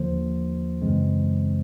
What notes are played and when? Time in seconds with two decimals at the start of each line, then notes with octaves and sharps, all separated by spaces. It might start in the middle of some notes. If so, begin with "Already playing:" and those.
Already playing: D#2 D3 F3 A#3 C5
0.82 F#2 C#3 E3 G#3 C4